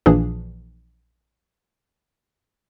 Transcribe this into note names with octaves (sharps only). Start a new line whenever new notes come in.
A#1 A#2 E3 A#3 D4 G#4